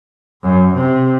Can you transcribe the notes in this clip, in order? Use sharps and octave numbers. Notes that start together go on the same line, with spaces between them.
F#2
C3